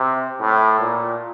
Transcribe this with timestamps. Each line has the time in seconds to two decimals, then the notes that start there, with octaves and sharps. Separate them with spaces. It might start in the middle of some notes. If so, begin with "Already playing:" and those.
Already playing: C3
0.40 A2
0.80 A#2